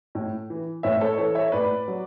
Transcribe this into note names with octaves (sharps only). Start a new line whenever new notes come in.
A2
E3
A2 C#5 E5
A4 C#5
E3 A4 C#5
C#5 E5
A2 B4 D5
F#3